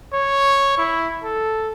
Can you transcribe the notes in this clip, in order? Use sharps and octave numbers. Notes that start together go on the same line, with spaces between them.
C#5
E4
A4